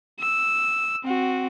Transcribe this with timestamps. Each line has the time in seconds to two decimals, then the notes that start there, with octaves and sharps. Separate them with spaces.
0.20 E6
1.04 C4 F#4